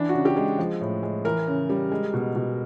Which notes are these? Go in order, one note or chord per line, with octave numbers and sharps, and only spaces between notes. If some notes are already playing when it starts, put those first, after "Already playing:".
Already playing: E3 D4
F#4
C#3
G4
G#3
F3
A2
G#3
E3 A#4
C#3
G3
G#3
B2
B2